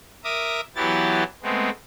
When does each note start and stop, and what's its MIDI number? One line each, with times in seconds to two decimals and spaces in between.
0.24 0.61 70
0.24 0.61 76
0.24 0.61 86
0.24 0.61 87
0.76 1.23 52
0.76 1.23 54
0.76 1.23 59
0.76 1.23 64
0.76 1.23 67
0.76 1.23 93
1.43 1.70 56
1.43 1.70 57
1.43 1.70 59
1.43 1.70 60